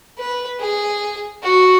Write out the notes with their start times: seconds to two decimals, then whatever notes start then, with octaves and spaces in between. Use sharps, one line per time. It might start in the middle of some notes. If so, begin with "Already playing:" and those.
0.18 B4
0.60 G#4
1.42 F#4